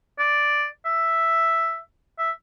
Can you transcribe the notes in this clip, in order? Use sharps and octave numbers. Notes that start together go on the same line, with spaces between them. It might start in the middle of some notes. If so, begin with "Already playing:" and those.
D5
E5
E5